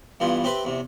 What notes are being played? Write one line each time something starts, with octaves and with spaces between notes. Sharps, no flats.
G2 E3 B3 F4
C4 G4 B4 C5 E5
E2 C3